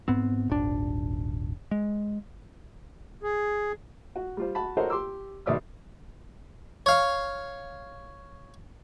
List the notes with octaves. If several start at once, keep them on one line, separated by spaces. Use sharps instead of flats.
G#2 B3 C4
D#1 G#1 D4
G#3
G#4
F#4
G3 F4 C5
F#4 A5 B5
F#4 A4 A#4 C5 C#5 D#5
G4 C6 D6 E6
B1 D#3 D5 E5 D#6 F6
C#5 F5